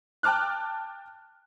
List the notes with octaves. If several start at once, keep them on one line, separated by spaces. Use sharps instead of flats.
G5 A5 D6 F6 F#6